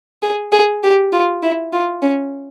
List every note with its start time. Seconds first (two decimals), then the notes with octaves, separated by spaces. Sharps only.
0.23 G#4
0.52 G#4
0.83 G4
1.12 F4
1.43 E4
1.72 F4
2.02 C#4